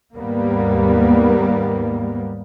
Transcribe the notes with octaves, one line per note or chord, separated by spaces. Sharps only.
D#2 G#2 G3 A#3 B3